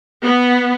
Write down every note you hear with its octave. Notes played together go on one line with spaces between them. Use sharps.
B3